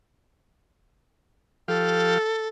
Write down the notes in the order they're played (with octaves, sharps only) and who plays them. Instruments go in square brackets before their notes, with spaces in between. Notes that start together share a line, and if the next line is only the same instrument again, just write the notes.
[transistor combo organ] F3 G4 F5 [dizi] A4